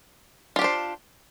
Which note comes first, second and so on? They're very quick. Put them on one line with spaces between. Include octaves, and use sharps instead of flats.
F4 G4 D4 C5